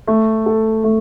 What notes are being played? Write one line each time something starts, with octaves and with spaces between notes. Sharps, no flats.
A3
A4
A3